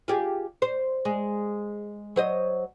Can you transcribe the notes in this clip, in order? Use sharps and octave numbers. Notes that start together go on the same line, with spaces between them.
F4 G4 G#4
C5
G#3
F#3 C5 D#5